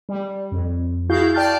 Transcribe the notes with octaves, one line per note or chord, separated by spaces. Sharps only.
G3
F2
E4 F#4 G#4 F5 G6
D5 G5 A5 F6 G6 A6